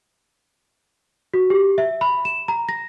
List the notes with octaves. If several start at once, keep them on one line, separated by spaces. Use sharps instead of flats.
F#4
G4
E5
B5
E7
A#5
A#6